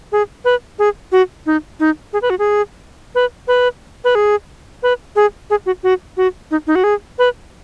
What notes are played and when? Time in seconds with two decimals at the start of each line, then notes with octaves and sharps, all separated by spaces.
0.12 G#4
0.45 B4
0.79 G#4
1.12 F#4
1.46 D#4
1.80 D#4
2.13 G#4
2.22 B4
2.30 F#4
2.39 G#4
3.15 B4
3.48 B4
4.04 B4
4.15 G#4
4.83 B4
5.16 G#4
5.50 G#4
5.66 F#4
5.83 F#4
6.17 F#4
6.51 D#4
6.67 D#4
6.75 F#4
6.84 G#4
7.18 B4